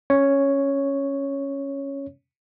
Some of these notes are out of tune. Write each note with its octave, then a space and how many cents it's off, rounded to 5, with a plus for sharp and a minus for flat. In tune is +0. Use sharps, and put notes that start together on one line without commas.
C#4 -5 C#5 +0